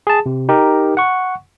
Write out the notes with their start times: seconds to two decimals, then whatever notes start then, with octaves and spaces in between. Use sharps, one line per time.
0.07 G#4 A5
0.26 C3
0.49 D#4 G4 A#4
0.97 F#5 C#6